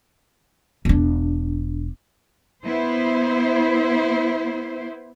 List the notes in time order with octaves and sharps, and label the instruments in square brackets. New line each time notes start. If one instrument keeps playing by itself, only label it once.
[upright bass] E1 D4
[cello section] B3 E4 C5